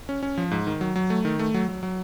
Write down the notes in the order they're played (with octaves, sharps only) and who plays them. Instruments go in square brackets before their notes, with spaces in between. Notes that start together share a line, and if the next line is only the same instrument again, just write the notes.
[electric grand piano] C#4
C#4
F3
G#2
D#3
F#3
F#3
A3
D#3
A3
F#3
F#3
F#3